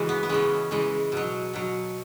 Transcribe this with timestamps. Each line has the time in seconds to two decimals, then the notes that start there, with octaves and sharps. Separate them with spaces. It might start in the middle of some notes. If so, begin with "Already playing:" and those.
Already playing: C#3 E3 G#3 C#4 F#4
0.09 B3
0.23 B3
0.29 C#3 E3 G#3 C#4
0.71 C#3 E3 G#3
1.12 B2 F#3
1.54 B2 F#3